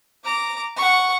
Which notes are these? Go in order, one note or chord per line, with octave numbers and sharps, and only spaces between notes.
A#5 D6
F#5 C#6